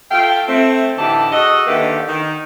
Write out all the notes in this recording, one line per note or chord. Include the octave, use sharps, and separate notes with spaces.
A3 F4 F5 G5
A3 C4
A2 D3 E3 D#4 G4 A5
F#4 G#4 A4 D#5
D3 D#3 A3 A#3 G4 B4
D#3